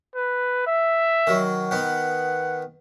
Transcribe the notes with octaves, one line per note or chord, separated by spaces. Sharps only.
B4
E5
D#3 F#3
D#3 B3 F#5